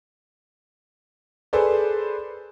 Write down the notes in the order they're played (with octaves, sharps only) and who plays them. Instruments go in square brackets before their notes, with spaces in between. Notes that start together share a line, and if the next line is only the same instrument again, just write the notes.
[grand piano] G#4 A4 B4 C5 D5